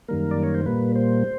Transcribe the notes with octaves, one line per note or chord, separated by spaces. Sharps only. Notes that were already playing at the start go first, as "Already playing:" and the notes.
F#2 D#3 G3 A#3 A#4
D5
C#5
C5
A#2 G3 A#3 B4
C5